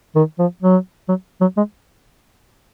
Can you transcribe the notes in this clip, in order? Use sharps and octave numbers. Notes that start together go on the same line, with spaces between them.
D#3
F3
F#3
F#3
F#3
G#3